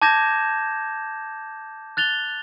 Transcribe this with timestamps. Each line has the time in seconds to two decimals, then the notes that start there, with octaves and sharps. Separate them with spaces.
0.02 A5 D6 G6 G#6 A#6 E7
1.97 F#6 A6 F7 G7